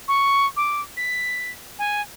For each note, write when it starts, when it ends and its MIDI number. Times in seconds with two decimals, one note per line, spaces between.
0.08 0.46 85
0.57 0.81 86
0.97 1.51 95
1.79 2.02 80